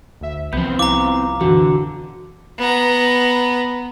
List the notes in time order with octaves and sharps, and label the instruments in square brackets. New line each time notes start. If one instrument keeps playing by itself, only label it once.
[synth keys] D2 E5
[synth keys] C2 F3 [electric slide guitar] B3 C4 [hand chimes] G6
[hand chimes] E4 F5 [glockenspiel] A#5 D6
[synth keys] F#2 B2 E3 [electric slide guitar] D3 [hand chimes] F#4
[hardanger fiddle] B3 A#5